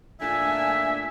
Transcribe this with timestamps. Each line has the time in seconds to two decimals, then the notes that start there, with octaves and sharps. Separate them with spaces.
0.21 A#2 A3 D4 E5 G#5